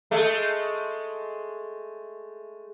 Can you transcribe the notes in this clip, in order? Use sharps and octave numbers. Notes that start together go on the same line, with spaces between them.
G#3 A3